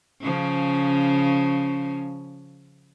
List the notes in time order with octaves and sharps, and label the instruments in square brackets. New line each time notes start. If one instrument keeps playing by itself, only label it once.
[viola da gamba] C#3 F3 C#4